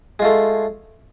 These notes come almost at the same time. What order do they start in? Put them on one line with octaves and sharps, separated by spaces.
G#3 F4 A3